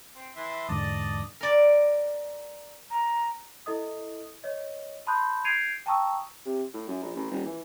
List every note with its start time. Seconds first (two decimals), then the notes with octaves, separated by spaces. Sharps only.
0.15 C4
0.36 E3 E5 C6
0.68 E2 G#2 D3 D5 D#5 A5
1.41 A#4 D5
2.90 A#5
3.66 E4 A4 D#5 D#6
4.44 C#5 D#5
5.07 A5 B5 C6 D#6 F#6 G6
5.44 G6 G#6 C7 D7 D#7 F7
5.86 G5 A5 A#5 C#6 D#6 E6
6.45 C3
6.74 A2
6.88 F#2
7.03 A#1
7.15 A1
7.31 D#1
7.45 E3